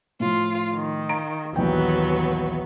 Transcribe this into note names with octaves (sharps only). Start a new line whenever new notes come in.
A2 F3 F4
D#3
F5 A#5 D7
A#1 D#2 E3 F#3 B3 G5